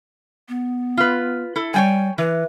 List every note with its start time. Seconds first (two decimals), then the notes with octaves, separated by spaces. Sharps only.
0.49 B3
0.97 F4 B4
1.56 E4 A4
1.74 G3 C#5 G5 G#5
2.18 E3 B4